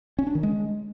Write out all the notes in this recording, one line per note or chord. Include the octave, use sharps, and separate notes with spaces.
C#4
D4
D#3
G#3